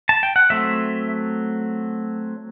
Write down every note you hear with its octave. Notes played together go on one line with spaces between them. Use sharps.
A5
G5
F#5
F#3 A3 C4 E5